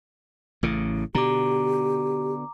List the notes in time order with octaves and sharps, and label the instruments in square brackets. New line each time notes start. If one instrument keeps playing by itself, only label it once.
[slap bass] A1 A2 C#3
[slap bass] B2 D3 [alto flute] G4 [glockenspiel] A#5 D6